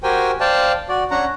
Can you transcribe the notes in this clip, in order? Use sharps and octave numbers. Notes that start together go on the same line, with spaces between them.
F#4 G4 A#4 C5 G5 G#5
C5 D5 F5 G5 A5
F#4 D5
C#4 D4 F#5 A#5